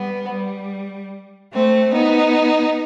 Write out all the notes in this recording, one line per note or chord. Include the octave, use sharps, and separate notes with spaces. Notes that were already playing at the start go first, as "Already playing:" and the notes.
Already playing: G3 B3
G3
A3 C4
B3 D#4